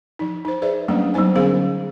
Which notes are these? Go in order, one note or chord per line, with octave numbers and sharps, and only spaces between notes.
F3 D#4
D#4 C5
G#4 B4 C5 D5 E5
F#3 G3 A3 A#3 C#4 D4
F#3 B3 D#4 C5 G#5
D3 B3 C#4 G#4 C5 F5